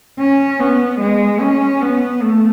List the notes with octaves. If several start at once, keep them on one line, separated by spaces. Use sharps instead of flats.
C#4
B3
G#3
C#4
B3
A3